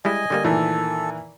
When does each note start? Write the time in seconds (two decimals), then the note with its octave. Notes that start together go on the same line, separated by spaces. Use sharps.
0.05 G3 G#3 E4 D#5 G#5
0.30 D3 G3 A#3
0.44 A#2 D#3 E3 A3 A4